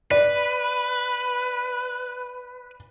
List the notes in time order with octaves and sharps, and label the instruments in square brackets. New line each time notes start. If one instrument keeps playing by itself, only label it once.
[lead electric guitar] B4 [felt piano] D5